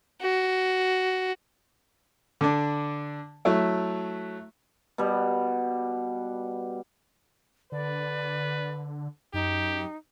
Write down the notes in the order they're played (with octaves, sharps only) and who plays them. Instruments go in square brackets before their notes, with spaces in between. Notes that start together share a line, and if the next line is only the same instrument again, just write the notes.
[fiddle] F#4
[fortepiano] D3 D4
F#3 A3 E4
[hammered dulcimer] B2 G3
[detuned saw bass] D3 [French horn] B4 [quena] D5
[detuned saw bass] F#2 [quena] D#4 [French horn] G4